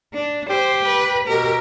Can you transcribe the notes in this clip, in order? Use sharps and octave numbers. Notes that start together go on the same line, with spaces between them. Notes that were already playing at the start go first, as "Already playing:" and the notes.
D4
G4 C5
B4
B2 G4 A#4